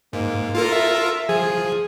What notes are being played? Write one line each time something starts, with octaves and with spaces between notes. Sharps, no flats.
G#2 A#3
F4 A4 A#4
E5
F3 G#4